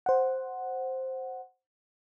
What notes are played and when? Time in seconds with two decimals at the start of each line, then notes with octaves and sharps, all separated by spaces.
0.06 C5 F#5